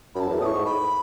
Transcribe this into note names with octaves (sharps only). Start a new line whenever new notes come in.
F#2 A5 B5
E2
A2 C#6 D#6
G#2
B5